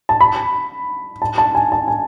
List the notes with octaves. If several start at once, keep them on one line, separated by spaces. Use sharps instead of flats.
A5
B5
A5
A5
G#5
A5
G#5